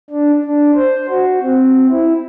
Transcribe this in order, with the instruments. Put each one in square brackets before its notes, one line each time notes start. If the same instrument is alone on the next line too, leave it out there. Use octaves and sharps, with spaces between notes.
[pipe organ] D4
D4
C5
F#4
C4
E4